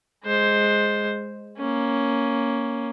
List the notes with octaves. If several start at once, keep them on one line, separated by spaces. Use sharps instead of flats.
G#3 C5
A#3 C#4